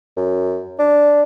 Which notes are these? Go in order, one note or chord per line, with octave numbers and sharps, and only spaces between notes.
F#2
D4